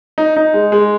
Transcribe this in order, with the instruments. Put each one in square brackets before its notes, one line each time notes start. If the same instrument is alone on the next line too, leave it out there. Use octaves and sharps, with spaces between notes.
[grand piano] D#4
D#4
G#3
G#3